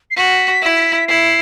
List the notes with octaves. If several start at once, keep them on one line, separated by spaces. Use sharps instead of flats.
C7
F#4 B6
E4
E4 C7